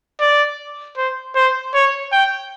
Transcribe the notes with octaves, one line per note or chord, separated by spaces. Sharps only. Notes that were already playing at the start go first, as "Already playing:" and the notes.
D5
C5
C5
C#5
G5